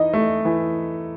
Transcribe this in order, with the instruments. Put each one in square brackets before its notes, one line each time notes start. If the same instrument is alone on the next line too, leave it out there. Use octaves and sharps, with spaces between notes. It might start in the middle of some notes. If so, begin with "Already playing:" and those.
Already playing: [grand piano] E3 D#4 [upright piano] D#5
[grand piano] A3
E3